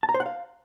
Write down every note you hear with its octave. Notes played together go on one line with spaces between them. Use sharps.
A5
A#5
C5
F#5
F5